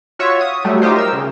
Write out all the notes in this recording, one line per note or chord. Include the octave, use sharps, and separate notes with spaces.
F4 F#4 C#5 E5
D#6
F#3 G3 A3
D#4 F4 G4 C5
A#4 E6
C#3